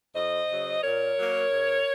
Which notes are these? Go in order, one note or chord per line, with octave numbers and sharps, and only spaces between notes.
F2 C5 D#5
C#3 F#3
A#2 A#4 C#5
F#3 A#3
G#2